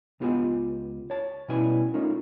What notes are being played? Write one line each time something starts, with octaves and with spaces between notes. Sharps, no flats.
C#2 B3 F4 G4 D#5 G#5
C#5 A5
B2 G3 C#4 E4 B4 G#5
A3 C#4 D#4 F4 A#4